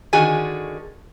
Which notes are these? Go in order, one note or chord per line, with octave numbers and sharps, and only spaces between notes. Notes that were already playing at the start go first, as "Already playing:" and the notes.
D3 D#3 F#4 G#4 G#5